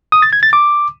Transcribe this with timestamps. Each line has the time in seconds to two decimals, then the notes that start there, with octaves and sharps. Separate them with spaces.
0.12 D#6
0.22 A6
0.33 G#6
0.43 A6
0.53 D6